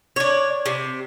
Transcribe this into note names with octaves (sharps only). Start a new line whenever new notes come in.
D4 C#5
C3